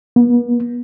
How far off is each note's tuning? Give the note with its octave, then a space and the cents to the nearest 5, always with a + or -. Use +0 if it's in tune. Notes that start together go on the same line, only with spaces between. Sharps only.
B3 -40